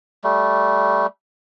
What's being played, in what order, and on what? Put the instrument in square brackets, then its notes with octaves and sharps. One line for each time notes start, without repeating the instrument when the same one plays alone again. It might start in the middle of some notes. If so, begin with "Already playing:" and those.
[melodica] G3 A3